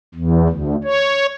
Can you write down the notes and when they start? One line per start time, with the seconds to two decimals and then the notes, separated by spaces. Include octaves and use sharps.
0.14 E2
0.49 D2
0.84 C#5